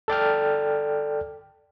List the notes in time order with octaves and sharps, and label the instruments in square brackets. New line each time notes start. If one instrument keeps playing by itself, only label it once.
[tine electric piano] A4 D5 G5 F6